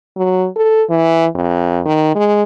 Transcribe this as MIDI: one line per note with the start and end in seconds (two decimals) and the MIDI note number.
0.17 0.47 54
0.56 0.83 69
0.90 1.26 52
1.35 1.81 41
1.85 2.14 51
2.15 2.43 56